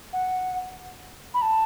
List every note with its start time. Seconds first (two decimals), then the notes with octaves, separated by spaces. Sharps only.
0.13 F#5
1.34 B5
1.42 A5